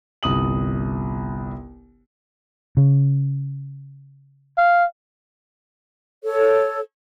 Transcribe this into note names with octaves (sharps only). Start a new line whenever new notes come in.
G1 C2 D#6 F#7
C#3
F5
A4 C#5